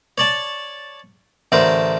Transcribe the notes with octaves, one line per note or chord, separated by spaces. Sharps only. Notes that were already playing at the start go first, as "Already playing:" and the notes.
C#5 D5 A5
A1 D3 A3 A#4 C5